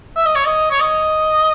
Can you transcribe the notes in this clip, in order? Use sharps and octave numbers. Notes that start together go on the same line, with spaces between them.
E5
D#5
C#5
D#5
C#5
D#5